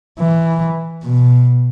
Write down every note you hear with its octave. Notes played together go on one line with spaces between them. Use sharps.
E3
B2